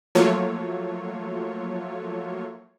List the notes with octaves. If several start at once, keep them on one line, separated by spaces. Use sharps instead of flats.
F3 F#3 A3 A#3 F4 C#5